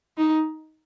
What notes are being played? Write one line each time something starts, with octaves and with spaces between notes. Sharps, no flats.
D#4